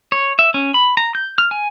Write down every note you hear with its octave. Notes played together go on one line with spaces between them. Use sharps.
C#5
E5
C#4
B5
A#5
G6
F6
G#5